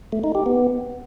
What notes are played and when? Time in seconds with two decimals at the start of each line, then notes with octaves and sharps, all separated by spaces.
0.12 A3
0.24 D#4
0.35 G4
0.46 B3